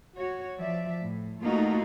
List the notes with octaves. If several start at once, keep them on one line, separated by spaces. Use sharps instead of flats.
F#4 C#5
F3 D5 E5
A2
A3 A#3 D#4 F4 F#4